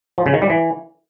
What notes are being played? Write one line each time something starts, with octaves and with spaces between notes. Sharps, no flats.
F3
C#3
D#3
G3
E3